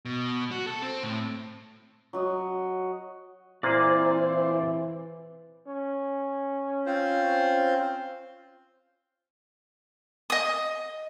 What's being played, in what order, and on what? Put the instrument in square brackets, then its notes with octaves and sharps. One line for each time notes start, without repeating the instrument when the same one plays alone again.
[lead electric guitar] B2
F#4
A4
C4
A2
[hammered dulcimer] F#3 F#4 D#5
[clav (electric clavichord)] A#2 A#3 G#4 [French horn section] E3 [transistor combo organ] C4 E4 C5 [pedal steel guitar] D5
[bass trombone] C#4
[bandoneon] C4 F4 C5
[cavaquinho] D#5 D#6